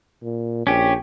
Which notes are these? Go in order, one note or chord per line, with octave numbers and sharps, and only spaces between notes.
A#2
A#1 C#4 G4